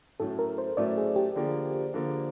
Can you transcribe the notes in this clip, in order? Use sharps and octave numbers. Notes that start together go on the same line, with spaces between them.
A2 F#3 A3 C#4 A4
A#4
C5
A2 F#3 A3 C#4 D5
G#4
G4
D3 F3 A#3
D3 F3 A#3